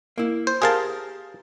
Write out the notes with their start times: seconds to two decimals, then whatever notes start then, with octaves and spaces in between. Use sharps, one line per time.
0.18 A#3 E4
0.47 C5
0.62 G4 G#4 A#4 C5 F5 A5